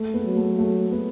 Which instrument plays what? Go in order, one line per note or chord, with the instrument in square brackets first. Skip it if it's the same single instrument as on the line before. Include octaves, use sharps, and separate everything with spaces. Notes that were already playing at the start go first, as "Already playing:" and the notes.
Already playing: [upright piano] A3
B3
[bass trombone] F#3
[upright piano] A3
A3
B3